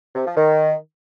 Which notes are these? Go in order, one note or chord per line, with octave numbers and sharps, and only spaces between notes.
C3
F3
D#3